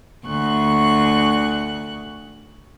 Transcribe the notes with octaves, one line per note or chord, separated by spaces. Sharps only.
D2 C#6 F#6